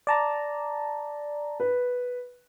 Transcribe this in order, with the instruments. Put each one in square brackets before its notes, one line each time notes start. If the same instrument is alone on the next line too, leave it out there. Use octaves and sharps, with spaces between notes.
[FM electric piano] D5 A5 A#5
[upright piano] B4